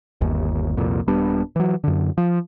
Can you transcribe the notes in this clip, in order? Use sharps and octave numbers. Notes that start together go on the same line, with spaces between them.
G1 D#2
C2 F2 A#2
D#1 G3 B3 D4
E3 F#3
F#2 D3
F3